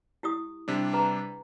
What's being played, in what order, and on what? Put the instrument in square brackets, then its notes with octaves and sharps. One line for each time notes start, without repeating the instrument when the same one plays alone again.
[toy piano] E4 G4 D#6
[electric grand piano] C3 G3 D4
[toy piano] G#4 B4 A#5